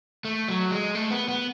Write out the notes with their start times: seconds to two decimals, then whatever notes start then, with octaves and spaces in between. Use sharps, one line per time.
0.25 A3
0.49 F#3
0.71 G#3
0.95 A3
1.11 B3
1.29 B3